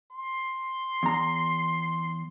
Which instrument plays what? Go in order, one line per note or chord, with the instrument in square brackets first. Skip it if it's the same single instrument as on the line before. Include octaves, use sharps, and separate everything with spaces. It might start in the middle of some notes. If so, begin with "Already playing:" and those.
[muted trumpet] C6
[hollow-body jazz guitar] E2 A#5